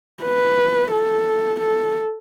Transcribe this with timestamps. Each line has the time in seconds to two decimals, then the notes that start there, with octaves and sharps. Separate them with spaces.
0.23 B4
0.91 A4
1.61 A4